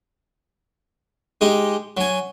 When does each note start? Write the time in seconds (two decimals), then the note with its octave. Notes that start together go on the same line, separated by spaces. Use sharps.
1.41 G#3 D#4 G4
1.97 F#3 G#5